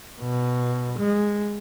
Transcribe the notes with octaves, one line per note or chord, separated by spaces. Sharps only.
B2
G#3